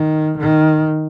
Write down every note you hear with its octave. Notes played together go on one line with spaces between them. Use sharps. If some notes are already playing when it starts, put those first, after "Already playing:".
Already playing: D#3
D#3